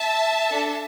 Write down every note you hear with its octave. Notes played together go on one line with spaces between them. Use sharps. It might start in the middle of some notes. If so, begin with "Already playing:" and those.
Already playing: E5 A5
D4 A4